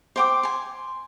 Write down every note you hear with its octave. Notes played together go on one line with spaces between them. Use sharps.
C5 G5 D6
G#5 C6